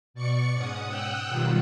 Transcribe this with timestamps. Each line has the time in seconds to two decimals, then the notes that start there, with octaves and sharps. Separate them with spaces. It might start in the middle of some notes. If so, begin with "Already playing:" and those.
0.14 B2 D5 C#6 C#7
0.54 G#2 C#4 F#5 D#6
0.88 F#5 G5 D#6 E6 F#6
1.28 B2 D#3 F#3 G3 F4